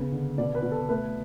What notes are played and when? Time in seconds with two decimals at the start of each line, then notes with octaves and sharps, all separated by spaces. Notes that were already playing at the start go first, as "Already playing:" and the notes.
Already playing: C#3 B3
0.12 D3
0.38 B2 D5
0.55 B4
0.63 B2
0.72 A4
0.89 A3 B4